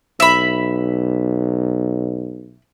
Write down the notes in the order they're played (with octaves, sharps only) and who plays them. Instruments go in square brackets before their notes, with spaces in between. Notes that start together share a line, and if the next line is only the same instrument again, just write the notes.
[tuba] B1 [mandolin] E5 B5